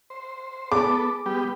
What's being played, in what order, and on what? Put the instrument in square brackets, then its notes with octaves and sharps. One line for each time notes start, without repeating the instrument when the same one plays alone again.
[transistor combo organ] C5
[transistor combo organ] B3 A4 [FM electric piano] G#4 [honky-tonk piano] D6
[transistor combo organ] G3 B3 G4